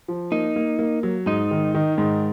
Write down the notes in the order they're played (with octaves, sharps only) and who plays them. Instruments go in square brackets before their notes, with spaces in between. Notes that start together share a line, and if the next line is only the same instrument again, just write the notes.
[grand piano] F3
[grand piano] A#3 [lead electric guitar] D#4
[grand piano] A#3
A#3
F#3
[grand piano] G#2 [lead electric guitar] D#4
[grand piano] D#3
D#3
G#2